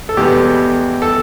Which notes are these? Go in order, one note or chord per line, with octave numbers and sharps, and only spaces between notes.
A4
E2 B2 G3 B3 G4
A4